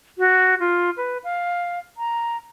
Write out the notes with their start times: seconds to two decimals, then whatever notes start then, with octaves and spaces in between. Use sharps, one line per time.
0.18 F#4
0.60 F4
0.97 B4
1.24 F5
1.98 A#5